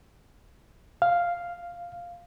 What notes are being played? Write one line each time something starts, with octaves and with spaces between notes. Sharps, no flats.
F5